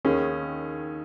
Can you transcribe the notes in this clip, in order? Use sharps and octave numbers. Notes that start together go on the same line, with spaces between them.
D#2 D#3 C#4 G#4